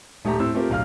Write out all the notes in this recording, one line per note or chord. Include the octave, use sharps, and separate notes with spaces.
D#1 A3 G4 A#5
A2 C4 E6
A3 C4 F4 G4 A#4
D1 B1 F5 F6